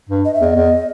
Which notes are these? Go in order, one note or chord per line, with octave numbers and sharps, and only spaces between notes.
G2
D#5
E5
E2 D#5
E2